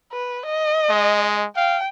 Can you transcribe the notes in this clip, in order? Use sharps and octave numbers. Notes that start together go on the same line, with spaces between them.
B4
D#5
G#3
F5 G5